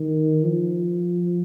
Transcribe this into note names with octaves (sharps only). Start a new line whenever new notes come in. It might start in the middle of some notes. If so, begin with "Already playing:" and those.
Already playing: D#3
F3